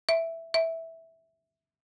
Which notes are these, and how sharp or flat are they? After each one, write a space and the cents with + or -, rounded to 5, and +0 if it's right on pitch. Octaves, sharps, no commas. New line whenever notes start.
E5 +0
E5 -10